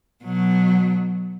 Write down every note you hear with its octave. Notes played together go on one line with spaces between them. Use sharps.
B2 F#3